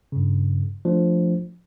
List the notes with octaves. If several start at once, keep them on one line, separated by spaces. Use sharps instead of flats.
G2 C#3
F3 A3 D4